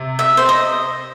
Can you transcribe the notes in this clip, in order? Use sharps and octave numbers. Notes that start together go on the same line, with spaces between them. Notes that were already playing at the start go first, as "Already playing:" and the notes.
Already playing: C3
E5
C5
D#5